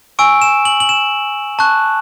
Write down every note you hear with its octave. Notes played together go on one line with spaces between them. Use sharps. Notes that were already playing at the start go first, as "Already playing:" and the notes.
G#5 C#6 E6 D7
E7
F#7
F#7
E7
A5 C#6 F#6